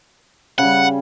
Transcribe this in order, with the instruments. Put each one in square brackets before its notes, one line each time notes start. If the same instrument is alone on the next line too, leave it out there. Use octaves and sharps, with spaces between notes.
[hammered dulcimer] C#3 G3 [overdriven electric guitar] F#5